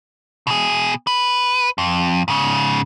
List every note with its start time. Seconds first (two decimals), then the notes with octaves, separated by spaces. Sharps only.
0.47 B2 G#4
1.07 B4
1.78 F2
2.28 G#2 C#3